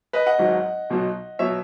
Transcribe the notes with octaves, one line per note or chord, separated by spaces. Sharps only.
B4 D#5
D#5 F#5
G#1 G#2 F#3
B1 B2 F#3
B2 F#3 C#5 E5